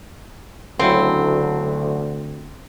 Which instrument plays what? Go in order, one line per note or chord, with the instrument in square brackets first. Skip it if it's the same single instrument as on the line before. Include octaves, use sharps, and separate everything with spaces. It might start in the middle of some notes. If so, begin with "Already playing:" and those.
[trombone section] D2 [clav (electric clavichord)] C#3 F#3 E4 [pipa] C4